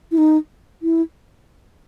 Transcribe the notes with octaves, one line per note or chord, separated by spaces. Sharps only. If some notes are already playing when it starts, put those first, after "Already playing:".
E4
D#4
E4